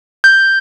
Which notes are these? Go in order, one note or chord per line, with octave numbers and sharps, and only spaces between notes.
G6